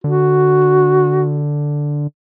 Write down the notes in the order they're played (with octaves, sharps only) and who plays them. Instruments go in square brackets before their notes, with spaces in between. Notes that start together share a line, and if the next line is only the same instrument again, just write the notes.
[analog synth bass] D3 [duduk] F#4